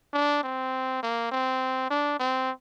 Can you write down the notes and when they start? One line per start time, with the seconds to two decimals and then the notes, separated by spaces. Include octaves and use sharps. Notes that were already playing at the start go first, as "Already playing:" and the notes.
0.14 D4
0.44 C4
1.03 A#3
1.32 C4
1.91 D4
2.20 C4